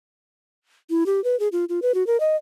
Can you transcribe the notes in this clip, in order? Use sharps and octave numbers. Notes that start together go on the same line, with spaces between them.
E4
G4
B4
G#4
F4
F4
B4
F#4
A#4
D#5